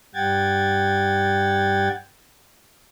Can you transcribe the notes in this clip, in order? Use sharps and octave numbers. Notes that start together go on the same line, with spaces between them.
G2 G3 F#5 G5 G#6 A6